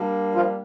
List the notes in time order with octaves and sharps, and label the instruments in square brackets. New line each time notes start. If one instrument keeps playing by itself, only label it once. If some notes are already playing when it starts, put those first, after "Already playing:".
Already playing: [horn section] G3 A#3 D4
[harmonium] F3 F4